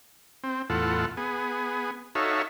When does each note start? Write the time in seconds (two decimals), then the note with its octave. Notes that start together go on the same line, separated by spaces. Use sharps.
0.44 C4
0.70 E2 A2 F4 A4 F#5
1.17 B3 G#4
2.15 D#4 F#4 A4 C#5 E5 F5